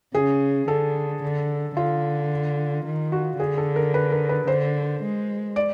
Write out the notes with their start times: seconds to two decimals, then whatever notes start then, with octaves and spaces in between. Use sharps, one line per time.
0.15 C#3 G#4
0.68 D3 A4
1.23 D3
1.76 D3 F4
2.86 D#3
3.12 F#4
3.39 D3 G#4
3.58 A4
3.76 A#4
3.94 B4
4.12 A#4
4.29 B4
4.47 D3 C5
5.02 G#3
5.56 D5